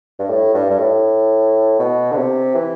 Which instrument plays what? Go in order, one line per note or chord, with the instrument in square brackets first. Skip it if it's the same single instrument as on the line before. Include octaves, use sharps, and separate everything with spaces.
[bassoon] G2
A2
G2
G2
A2
B2
D3
C3
E3